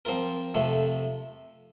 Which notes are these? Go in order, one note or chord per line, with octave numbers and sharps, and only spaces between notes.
F3 C4 F4 A#4
F2 C3 F3 A3